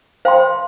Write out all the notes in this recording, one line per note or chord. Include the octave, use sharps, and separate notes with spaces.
C5 F5 G5 C6